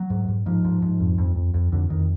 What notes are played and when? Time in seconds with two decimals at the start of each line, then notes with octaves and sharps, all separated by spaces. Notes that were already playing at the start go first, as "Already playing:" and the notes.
Already playing: F#3
0.10 G#2
0.28 G#2
0.46 G#2 F3
0.65 G#2
0.82 G#2
1.00 F2
1.18 F2
1.36 F2
1.54 F2
1.72 F2 D3
1.90 F2 D#3